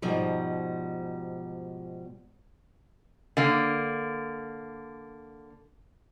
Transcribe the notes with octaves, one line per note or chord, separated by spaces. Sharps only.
G#2 B2 F3 G3
D3 A#3